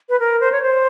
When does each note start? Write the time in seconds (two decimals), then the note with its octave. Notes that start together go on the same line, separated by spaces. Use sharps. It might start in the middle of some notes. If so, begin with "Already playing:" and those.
0.09 B4
0.20 A#4
0.40 C5
0.52 C#5
0.62 C5